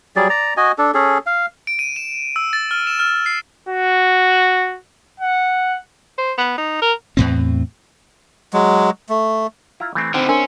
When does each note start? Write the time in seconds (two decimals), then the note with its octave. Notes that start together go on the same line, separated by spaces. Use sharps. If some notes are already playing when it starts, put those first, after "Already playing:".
0.16 F#3 G3 G#4 D5
0.29 D5 A#5
0.57 F#4 D#5 G#5
0.78 D4 A4
0.94 C#4 G#4 A4
1.26 F5
1.67 D7
1.79 D#7
1.96 E7
2.36 E6
2.53 A6
2.71 F6
2.87 E7
2.99 F6
3.26 C7
3.69 F#4
5.20 F#5
6.18 C5
6.38 B3
6.58 D#4
6.82 A#4
7.17 E2 A2 C4
8.53 F#3 G#3
9.09 A3
9.80 E4 F4 A#5
9.95 E3 A3 C4
10.14 D3 D#3 B3 C4
10.29 C#4 D4 A#4 D#5 C6